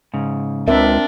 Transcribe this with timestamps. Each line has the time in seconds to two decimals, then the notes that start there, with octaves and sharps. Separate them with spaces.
0.14 G#2 C#3
0.68 C#2 C4 D4 A#4 E5